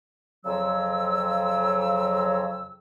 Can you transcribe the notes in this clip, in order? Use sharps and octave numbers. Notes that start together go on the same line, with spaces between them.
F2 C#3 F#3 E6